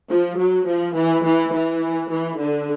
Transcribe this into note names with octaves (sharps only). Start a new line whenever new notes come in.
F3
F#3
F3
E3
E3
E3
E3
D3